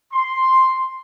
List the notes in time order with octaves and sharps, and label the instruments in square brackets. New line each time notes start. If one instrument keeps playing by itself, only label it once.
[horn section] C6